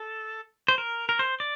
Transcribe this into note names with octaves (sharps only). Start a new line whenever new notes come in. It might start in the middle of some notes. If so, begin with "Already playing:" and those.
Already playing: A4
C5
A#4
A#4
C5
D5